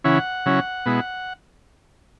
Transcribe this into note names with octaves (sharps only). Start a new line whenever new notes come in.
C#3 E3 C#4 E4 F#5
C#3 F#3 C#4 E4
B2 G#3 B3 E4